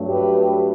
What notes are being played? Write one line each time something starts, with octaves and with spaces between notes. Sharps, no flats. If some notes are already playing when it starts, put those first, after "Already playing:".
Already playing: G2 F#3 A3
G4 B4